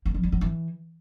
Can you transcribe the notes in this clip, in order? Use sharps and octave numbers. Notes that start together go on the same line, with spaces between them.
A#3
F3
G3
F#3
E3